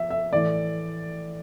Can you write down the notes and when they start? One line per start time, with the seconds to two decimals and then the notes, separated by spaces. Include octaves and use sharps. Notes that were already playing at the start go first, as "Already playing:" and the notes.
Already playing: F3 E5
0.10 E5
0.32 A2 E3 A3 D5